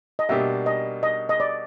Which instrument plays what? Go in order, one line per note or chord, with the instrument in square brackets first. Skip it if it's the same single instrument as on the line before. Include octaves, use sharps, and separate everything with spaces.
[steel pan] D#5
[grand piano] B2 G3 A#3 D4 G4 [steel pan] E5
[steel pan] D#5
D#5
D#5
D5